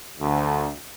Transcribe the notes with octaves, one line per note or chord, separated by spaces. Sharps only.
D2